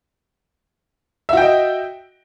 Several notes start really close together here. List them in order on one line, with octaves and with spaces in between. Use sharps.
E5 F#4 G5 D#5